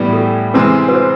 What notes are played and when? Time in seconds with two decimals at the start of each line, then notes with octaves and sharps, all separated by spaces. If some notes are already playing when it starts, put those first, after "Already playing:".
Already playing: A2 E3 G3 B3
0.13 A4
0.54 C3 E3 G#3 C4 B4
0.89 B4
0.95 C5